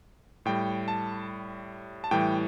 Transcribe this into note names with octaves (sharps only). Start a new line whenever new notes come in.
A2 G3 G5
A5
A5
A2 E3 G3 G5